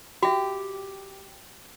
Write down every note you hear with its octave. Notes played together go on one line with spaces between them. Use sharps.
F#4 G4 E5